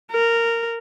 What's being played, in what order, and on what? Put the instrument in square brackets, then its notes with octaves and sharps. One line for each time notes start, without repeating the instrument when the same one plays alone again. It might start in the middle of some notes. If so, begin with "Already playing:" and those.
[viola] A#4